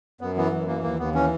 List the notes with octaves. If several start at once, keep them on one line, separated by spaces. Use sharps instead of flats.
F#2 B3
E3 B3
F#2
E3 A#3
D#2 A#3
D#2 B3
E3 C#4